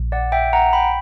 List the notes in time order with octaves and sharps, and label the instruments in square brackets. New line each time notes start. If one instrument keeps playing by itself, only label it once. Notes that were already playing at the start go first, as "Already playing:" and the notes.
Already playing: [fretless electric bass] A#1
[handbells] D5 F#5
E5 G5
F#5 A#5
G5 B5